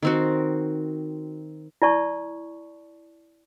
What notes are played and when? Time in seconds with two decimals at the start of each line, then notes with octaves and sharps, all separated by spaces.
0.02 D#3 C4 F#4
1.82 E4 D5 A5 C#6